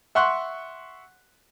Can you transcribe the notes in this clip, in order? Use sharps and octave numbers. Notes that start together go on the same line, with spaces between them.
E5 F#5 C6 C#6 F#6